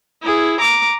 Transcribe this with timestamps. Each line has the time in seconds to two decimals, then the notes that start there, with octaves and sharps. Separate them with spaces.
0.22 E4 G#4
0.60 A#5 D6